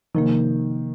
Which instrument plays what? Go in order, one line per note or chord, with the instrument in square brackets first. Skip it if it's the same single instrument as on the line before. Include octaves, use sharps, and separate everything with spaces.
[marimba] C3 F3 A#3 [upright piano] D#3